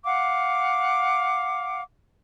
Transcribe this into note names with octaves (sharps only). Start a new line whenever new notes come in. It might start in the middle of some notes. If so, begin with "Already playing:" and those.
F5 F#5 D6